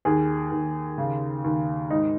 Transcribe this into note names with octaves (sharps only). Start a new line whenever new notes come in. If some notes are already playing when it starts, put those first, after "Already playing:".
D#2 G#4
D#2
C#3
D#2
G#2 D#4